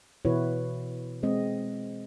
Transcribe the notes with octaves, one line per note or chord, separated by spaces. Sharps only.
B2 E3 E4 F#4 B4 C#5
G#3 C4 D#5